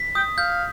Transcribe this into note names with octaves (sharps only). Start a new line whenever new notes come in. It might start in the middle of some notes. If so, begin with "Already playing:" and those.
Already playing: B6
G5 D#6
F5 G6